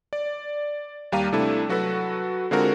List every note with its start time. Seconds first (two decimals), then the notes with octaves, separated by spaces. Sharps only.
0.13 D5
1.12 D#2 G3 F5 A#5 D#7
1.32 C3 A3 D4 E4 A4
1.69 F#3 F#4 A4 B4
2.51 D3 G#3 C4 F4 F#4 A#4